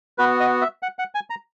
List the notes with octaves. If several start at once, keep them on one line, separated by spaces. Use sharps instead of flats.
B3 F#4 B4
D#5
E5
F#5
F#5
G#5
A#5